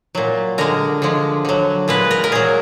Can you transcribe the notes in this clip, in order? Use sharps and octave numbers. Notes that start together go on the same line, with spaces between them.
A#2 F#3
D3 G#3 A#4
D3 F3 G#3
D3 F#3
A#2 G#3 B4
A#4
A#4
A#2 F#3 G#4